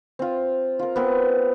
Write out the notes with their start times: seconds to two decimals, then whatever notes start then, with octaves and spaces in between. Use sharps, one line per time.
0.19 C4 F4
0.79 F4 A#4
0.96 B3 C4 A#4